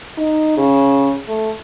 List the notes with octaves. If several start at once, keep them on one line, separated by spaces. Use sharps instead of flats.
D#4
C#3
A3